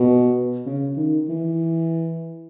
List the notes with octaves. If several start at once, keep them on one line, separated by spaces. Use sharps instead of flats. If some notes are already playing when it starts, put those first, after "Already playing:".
Already playing: B2
C#3
D#3
E3